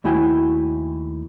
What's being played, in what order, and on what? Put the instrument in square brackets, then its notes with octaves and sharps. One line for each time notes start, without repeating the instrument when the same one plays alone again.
[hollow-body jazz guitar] D#2 A3 E4 F#4 G5 G#5